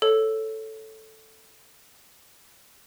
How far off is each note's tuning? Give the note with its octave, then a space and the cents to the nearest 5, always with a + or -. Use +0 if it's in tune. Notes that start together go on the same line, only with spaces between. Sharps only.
A4 +0 C#5 +0